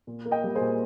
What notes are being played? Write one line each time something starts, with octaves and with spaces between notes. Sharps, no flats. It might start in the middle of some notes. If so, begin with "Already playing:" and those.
A#2
A#3
D#5 G5
G3
G#4 C5
A#2